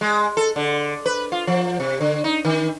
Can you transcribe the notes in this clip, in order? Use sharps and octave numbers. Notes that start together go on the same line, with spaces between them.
G#3
A4
D3
B4
F4
F3
C3
D3
D#4
D#3